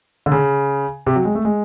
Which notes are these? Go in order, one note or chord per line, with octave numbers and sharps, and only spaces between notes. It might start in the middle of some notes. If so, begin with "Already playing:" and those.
D3
C#3
C3
F#3
G#3
A3
G#3